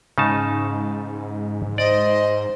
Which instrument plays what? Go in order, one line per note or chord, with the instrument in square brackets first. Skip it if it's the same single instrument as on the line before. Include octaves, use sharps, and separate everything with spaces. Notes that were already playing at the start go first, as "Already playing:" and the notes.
[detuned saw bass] G#2 [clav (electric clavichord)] C#3 D#4 A5
[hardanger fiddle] C5 [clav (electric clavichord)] D5 [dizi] D#5